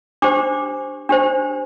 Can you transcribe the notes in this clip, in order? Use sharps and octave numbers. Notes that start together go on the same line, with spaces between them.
D4 G4 C5 D6
D4 G4 C5